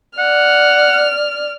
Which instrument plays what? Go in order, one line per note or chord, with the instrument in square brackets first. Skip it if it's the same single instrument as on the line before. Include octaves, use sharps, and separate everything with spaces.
[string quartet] D5 F6 [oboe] F#5